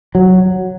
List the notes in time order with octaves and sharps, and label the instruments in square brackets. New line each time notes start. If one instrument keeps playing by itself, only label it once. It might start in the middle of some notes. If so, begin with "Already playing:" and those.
[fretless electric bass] F#3